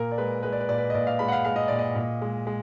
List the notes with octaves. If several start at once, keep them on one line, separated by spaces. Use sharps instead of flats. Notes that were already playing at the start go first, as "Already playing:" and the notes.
Already playing: A#2 A#4
D5
G#3 B4
G#3 B4
D5
B4
A#2 D5
B4
D#5
A#2 D5
F5
G#3 B5
F#5
F5
G#3 F5
D#5
A#2 D5
D#5
A#2
G#3
G#3